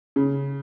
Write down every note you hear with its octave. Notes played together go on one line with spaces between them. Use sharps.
C#3